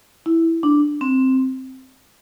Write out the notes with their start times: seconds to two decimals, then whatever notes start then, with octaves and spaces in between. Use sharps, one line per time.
0.26 E4
0.63 D4
1.01 C4